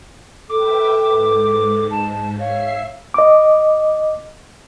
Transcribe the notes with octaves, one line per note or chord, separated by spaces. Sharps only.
A4 B4 E5 G5 D6
G#2
D#4 A5
C#5 E5 F5 C7
D#5 D6